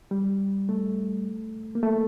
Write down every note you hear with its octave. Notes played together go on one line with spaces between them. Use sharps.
G3
A3
A#3
A3